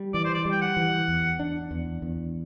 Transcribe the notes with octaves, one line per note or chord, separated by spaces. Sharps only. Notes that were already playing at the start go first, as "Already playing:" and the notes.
Already playing: G3
E3 D5
C5
D5
G3
G5
F#5
E3
E2
D4
E2
E2